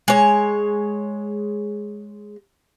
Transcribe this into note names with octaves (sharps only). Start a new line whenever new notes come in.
G#3 C#5